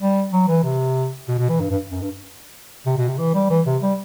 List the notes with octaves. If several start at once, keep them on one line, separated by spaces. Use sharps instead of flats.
G3
F#3
E3
C3
B2
B2
E3
G2
G2
F#2
G2
C3
B2
C3
E3
G3
E3
C3
G3